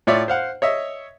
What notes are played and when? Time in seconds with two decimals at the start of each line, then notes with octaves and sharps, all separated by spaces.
0.07 A2 F4 C#5 D5 E5
0.28 C5 F5 F#5
0.62 C#5 D#5 E5